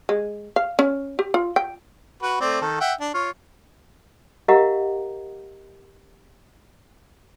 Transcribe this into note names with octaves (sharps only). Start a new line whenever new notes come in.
G#3
F5
C#4
G4
F4
G5
F#4 B4
A3 C4 D5
D#3 A4
E5 F#5 G5
D4
F4 C#5
G4 A#4 D#5 F5 F#5 A#5